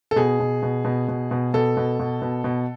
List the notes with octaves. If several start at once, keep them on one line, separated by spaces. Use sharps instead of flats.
A4
B2 G#4
B2
B2
B2
B2
B2
B2 A4
B2
B2
B2
B2